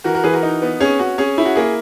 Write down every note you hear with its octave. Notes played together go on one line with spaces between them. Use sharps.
E3 F#4 A#4
F#4 A#4
E3 G#4 B4
F#4 A#4
D#4
B3
C#4 G#4
C#4 F#4
C#4 G#4
E4
F#4
A#3 G#4